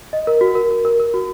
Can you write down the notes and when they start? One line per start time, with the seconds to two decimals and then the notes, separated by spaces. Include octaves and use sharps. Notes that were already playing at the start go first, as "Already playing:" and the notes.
0.13 D#5
0.27 A#4
0.41 F#4
0.55 A#4
0.71 A#4
0.85 A#4
1.00 A#4
1.14 F#4